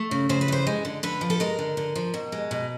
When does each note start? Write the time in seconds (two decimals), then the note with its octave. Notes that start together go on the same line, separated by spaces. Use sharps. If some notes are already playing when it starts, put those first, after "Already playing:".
Already playing: A3
0.11 C#3
0.29 C#3 C5
0.41 B4
0.48 E3 C5
0.67 G#3
0.85 D3
1.03 D3 B4
1.21 F3
1.30 A4
1.40 G#3 A#4
1.59 D3
1.77 D3
1.95 F3
2.14 B2
2.32 G#3
2.51 B2